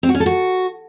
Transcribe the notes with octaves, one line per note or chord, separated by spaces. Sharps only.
C4
F#4
C#4
A4
F#4